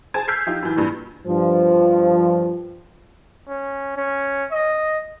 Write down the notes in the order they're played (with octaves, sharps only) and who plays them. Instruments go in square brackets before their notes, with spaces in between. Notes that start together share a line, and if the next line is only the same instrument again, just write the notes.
[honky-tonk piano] G#4 C5 G#5 A5 G#6
E6 F6 G6 G#6 B6 C7
F3 D#4 F4 G4
F#2 E3
G2 A#2 E3
[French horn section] G2 F3
[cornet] C#4
C#4
D#5